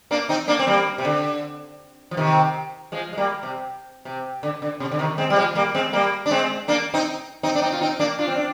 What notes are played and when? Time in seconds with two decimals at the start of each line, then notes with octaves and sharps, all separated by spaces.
0.11 A#3 D4
0.29 C4 D#4
0.48 A#3 D4
0.59 C4
0.67 G3 A#3
0.98 C3
1.05 D3
2.11 F3
2.17 C3 D#3
2.92 F3 G#3
3.13 G#3
3.17 G3 A#3
3.43 C3
4.05 C3
4.43 D3
4.62 D3
4.80 C3
4.91 D3
4.99 C3 D#3
5.18 G#3 C4
5.30 G3
5.36 F3 G#3
5.55 G3 A#3
5.75 G#3 C4
5.93 G3 A#3
6.26 D4
6.31 G#3 C4
6.68 A#3 D4
6.94 C4 D#4
7.43 C4 D#4
7.55 D4
7.62 C4 D#4
7.73 F4
7.81 C4 D#4
7.99 A#3 D4
8.19 D4 F4
8.28 C4
8.36 D4